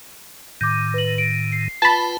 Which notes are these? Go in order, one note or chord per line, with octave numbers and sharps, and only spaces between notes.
A2 D#3 D6 G6
B4 F#7
D7
C7
F4 B4 G5 A5 B5